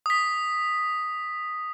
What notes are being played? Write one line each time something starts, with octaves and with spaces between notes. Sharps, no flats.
D#6 B6